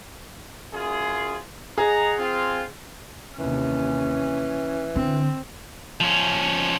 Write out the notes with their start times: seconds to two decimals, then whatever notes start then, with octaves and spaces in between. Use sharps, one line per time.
0.73 F#2 F4 G#4
1.78 G#4 D#5 F#5 A#5
2.18 C4 F4
3.39 D#2 C3 E3 C#4
4.96 D3 C4
6.01 F3 C#4